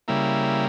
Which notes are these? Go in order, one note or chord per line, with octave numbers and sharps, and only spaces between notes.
C#3 G3 A#3 E4